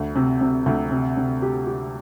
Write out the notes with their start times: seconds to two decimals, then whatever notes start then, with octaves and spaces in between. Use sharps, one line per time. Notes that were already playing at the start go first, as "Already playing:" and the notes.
Already playing: D2
0.16 C3
0.41 C3
0.66 D2
0.91 C3
1.17 C3
1.42 G4
1.67 G4